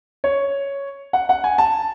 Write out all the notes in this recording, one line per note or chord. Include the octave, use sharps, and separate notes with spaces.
C#5
F#5
F#5
G#5
A5